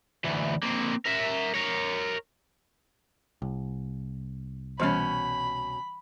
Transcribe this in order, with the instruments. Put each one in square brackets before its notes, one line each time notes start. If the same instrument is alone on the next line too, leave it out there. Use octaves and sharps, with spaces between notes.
[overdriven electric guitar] D2 E3
A#3 C4
A#4 E5
A#4 C#5
[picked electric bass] C2
[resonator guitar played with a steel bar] B2 C#4 [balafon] E3 G3 C#5 [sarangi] B5